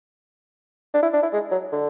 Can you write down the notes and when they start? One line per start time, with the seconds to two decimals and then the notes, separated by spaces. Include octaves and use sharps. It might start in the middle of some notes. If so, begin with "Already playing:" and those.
0.94 D4
1.03 E4
1.13 D4
1.23 E4
1.33 G#3
1.51 F#3
1.72 D3